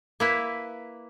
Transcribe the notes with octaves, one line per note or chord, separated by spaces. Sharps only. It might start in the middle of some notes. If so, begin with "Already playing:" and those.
A#3 E4 B4